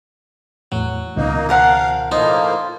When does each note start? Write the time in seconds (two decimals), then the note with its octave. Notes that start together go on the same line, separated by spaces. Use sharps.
0.72 E2 A2 E3 F#3
1.16 C#2 B2 D#3 A#3 D#4
1.49 F3 A#4 F5 F#5
2.11 A2 F3 A#3 D#4 F4 D#5